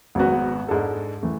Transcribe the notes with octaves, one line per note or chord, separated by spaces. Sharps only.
G#1 G#2 F#3 B3 F#4
G#2 G#3 D4 A4
E3 A3